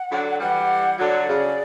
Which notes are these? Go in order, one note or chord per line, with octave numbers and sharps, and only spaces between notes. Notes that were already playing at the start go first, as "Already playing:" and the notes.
Already playing: F#5
D3 F#3
E3 G3 F#5
D3 F#3 D5
C#3